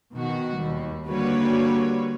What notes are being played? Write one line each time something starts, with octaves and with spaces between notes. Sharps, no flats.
B2 D#3 F#4
D#2 G3
D3 G3 A#3 F#4 B4 C#5